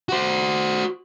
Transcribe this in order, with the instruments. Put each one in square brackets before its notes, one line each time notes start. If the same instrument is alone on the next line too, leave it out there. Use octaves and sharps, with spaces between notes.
[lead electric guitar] F#4 C5